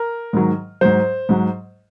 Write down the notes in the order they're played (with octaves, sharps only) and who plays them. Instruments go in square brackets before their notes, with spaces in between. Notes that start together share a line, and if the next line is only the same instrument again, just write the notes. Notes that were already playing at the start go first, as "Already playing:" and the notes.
Already playing: [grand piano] A#4
G#2 D#3 F#3
G#2 F#3 C5
G#2 F#3